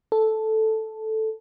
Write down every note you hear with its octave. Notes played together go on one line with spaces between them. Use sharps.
A4